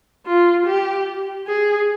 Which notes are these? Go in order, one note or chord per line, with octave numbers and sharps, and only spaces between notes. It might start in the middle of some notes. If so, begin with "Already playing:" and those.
F4
G4
G#4